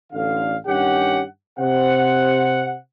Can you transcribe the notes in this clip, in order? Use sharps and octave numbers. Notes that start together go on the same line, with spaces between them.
A1 D3 F5
G2 D#3 C#4 G4 F#5
C3 C5 F#5